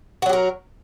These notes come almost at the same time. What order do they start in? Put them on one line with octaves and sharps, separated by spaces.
F#4 F#3 G4 A#4